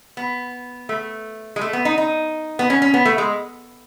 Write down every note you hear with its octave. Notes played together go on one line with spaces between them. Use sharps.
B3
A3
G#3
A3
B3
D#4
D#4
B3
C#4
C#4
B3
A3
G#3